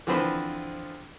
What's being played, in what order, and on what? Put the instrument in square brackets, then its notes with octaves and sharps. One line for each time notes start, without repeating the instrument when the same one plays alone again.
[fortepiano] D3 E3 F3 C4 B4 C5